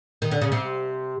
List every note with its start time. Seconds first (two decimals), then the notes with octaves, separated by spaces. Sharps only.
0.22 D#3
0.31 D3
0.41 C#3
0.52 C3